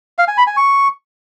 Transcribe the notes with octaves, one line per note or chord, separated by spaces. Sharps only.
F5
G#5
B5
G#5
C#6